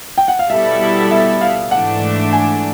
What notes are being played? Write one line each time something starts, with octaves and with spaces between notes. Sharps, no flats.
G5
F#5
F5
B2 G3 B3 E4 A4 E5
E5
F5
G#2 E3 A3 D4 F#5
G#5